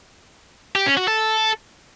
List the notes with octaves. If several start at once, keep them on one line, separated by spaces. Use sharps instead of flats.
G4
C#4
F#4
A4